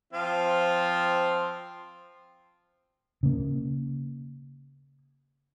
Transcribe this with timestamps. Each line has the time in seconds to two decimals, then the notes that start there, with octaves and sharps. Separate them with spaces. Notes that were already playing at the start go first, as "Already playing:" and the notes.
0.13 F3 C4 F4
3.23 C#3 A#3